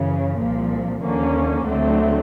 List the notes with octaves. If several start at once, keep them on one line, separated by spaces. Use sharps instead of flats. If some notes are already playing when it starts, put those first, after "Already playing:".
Already playing: F#2 C#3 E3
C2 A#2 F3
D#2 D3 F3 A#3 C#4
D2 D3 F#3 A3 C4